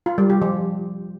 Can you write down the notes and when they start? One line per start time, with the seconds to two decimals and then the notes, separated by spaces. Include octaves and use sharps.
0.06 F4
0.18 G3
0.30 G4
0.42 F3